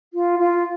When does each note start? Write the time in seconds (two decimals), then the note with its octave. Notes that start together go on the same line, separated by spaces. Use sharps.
0.13 F4
0.38 F4